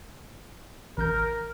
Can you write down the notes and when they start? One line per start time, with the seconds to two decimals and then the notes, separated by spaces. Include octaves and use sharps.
0.98 A1 A#4 G6